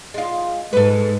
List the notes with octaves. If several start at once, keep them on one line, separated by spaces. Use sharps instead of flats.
G#3 F4
G#2 A4 B4